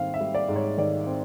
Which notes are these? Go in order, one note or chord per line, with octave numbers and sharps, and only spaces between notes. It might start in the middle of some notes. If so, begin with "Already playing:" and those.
Already playing: G#2 D#3 G3 C4 F5
E5
G3
D5
G#2
C#5
D#3 D5
C4